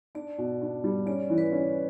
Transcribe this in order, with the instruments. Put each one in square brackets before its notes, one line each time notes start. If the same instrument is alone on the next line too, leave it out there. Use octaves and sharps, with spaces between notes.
[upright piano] D4 [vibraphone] D5
[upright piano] B2
D4
G3
[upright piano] C#4 [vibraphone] D5
[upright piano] E3
[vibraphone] B4
[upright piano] C#4